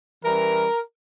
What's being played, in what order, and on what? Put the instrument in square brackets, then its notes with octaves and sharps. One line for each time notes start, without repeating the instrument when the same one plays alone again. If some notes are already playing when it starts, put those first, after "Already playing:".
[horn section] E3 G3 C#4 A#4